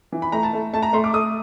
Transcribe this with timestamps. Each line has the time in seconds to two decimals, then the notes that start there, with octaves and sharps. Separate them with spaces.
0.12 E3
0.22 B5
0.32 A3 A#5
0.43 A5
0.53 A3
0.73 A3 A5
0.83 A#5
0.93 A3 C6
1.04 D6
1.13 A3 D#6